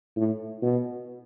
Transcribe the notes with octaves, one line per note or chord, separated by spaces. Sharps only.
A2
B2